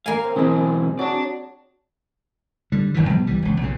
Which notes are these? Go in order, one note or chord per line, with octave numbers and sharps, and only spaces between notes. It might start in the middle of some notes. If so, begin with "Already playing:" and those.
A#3 F5 G#5
C4
B1 E3 G#3 C4 G#4
F#3 D5 A5
D3 G3
F1 D#2 D#3 E3
B2 F3 G3 B3
C2 E3 G3
E1 C#2
B1 A#2 C#3